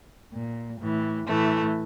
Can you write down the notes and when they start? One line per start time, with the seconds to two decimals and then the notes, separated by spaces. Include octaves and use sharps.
0.34 A#2
0.81 A2 E3
1.27 A2 E3 A3